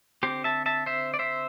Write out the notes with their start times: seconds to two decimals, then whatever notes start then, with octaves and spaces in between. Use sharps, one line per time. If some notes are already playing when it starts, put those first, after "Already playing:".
0.23 D3 C4 G4 C5
0.44 E5 A5
0.66 E5 A5
0.86 C5 E5
1.14 D5
1.19 C5 E5